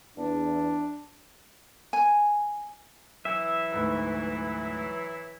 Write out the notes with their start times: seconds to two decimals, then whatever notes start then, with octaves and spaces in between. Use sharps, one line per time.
0.17 E2 D4
1.93 G#5
3.25 E3 F#3 E4 E5
3.72 D2 G#2 B4